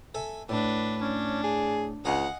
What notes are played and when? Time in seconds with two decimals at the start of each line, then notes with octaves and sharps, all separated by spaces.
0.15 A4 E5 G#5
0.49 A2 D4 B4
1.01 C#4 D4
1.44 G#4
2.05 C#2 D#5 F5 F#5 G#5